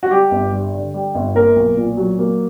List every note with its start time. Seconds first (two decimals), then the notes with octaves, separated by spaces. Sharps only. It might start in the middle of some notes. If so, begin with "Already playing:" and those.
0.03 F#4
0.11 G3 G4
0.31 G1
0.52 G2
0.74 D3
0.94 G3
1.15 G1
1.35 A#3 A#4
1.56 B1
1.77 A#2
1.97 F#3
2.19 A#3